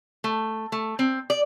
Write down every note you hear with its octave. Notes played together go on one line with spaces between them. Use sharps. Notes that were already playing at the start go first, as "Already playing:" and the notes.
A3
A3
C4
D5